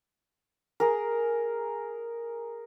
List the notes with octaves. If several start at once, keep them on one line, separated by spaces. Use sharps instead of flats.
G#4 A#4